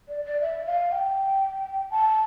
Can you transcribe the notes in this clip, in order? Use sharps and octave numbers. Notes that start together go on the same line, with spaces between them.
D5
D5
E5
F5
G5
A5